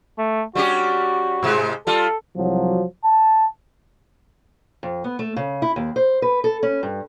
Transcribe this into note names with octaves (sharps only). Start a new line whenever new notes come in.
A3
G3 C#4 F#4 G4
G#2 C3 G#3
G3 F4 A4
C2 F3 F#3
A5
F2
B3
A3
C#3
E4
D#2
C5
B4
A4
C#4
G2